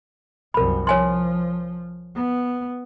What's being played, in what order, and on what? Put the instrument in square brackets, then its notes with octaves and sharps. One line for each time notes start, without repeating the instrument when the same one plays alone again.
[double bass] C2 F#2 [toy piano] A#4 B5
[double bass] F3 [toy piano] C#5 G#5 C6
[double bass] B3